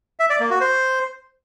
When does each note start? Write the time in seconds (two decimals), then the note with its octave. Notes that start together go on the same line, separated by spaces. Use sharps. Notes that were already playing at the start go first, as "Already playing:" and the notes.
0.19 E5
0.30 D5
0.40 A#3
0.50 F#4
0.61 C5